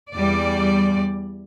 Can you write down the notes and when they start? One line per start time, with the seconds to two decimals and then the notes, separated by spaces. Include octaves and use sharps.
0.14 E2 G3 D5